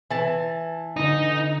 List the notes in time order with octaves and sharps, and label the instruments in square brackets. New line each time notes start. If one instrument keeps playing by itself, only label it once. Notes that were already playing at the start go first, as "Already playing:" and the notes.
[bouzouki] E3 A5
[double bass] D3 [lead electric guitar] D#4